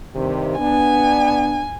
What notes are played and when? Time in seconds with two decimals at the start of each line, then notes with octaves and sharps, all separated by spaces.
0.15 G2 C3 D#3
0.59 B3 D4 G#5